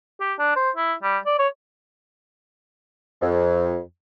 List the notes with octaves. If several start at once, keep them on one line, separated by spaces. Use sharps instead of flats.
G4
D4
C5
E4
G3
D5
C#5
F2